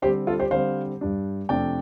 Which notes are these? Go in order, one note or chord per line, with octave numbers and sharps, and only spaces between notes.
D3 G3 C4 G4 C5
F4 A4
G4 C5
D3 G3 C4 C5 F5
G2 G3 D4
F2 C3 A3 D4 D5 G5